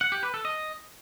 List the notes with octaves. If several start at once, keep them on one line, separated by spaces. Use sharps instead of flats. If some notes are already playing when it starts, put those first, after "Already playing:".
F#5
G4
B4
A4
D#5